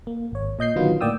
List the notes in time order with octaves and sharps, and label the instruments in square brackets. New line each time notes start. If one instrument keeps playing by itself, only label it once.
[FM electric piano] A#3
G#1 C#5
A#2 D#5 G6 C7
D3 D#3 F#3 B3 F4
A2 A#3 D5 G5 D#6 E6